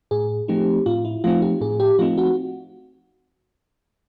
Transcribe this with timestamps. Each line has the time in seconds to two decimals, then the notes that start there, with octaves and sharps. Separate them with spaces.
0.11 A2 G#4
0.48 F3 A3 C4 D#4 G4
0.86 A2 F4
1.05 E4
1.24 F3 A3 C4 D#4 F4
1.42 G4
1.61 A2 G#4
1.80 G4
1.99 F3 A3 C4 D#4 F4
2.18 F#4